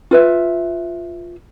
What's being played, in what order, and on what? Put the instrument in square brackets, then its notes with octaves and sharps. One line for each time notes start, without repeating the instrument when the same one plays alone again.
[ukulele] F4 B4 E5